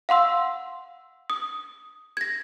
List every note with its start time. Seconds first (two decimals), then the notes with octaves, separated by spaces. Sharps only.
0.09 F5 F#5 C6 E6
1.30 D#6
2.17 G#6 A#6